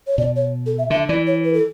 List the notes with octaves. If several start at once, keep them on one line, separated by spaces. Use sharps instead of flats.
C#5
B2 D5
C#5
A4
E5
D3 E5
E3 D5
C#5
B4
A4